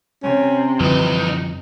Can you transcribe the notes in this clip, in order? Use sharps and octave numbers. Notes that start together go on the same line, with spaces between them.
C3 C#4
C2 F#2 D3 E3 F3 D#4